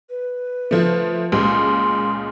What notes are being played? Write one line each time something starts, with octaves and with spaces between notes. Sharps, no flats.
B4
F3 A3
C#2 A#2 G#3 C6